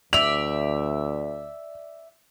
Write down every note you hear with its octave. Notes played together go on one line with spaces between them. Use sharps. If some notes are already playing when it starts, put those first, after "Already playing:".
D2 D5 E5 F7